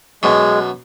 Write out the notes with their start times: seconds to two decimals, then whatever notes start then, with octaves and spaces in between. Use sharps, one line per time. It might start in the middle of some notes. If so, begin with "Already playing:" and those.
0.23 F#2 B2 G#3